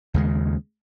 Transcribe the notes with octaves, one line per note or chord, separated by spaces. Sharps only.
D#2 C#3 G#3